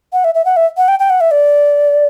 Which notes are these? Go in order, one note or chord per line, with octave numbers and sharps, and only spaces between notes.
F#5
E5
E5
F#5
E5
F#5
G5
G5
F#5
E5
D5